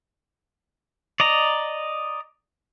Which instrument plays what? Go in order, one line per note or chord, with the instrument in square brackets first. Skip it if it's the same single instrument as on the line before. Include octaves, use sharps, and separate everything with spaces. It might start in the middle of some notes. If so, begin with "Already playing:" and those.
[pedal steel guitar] D5 D#5 A#5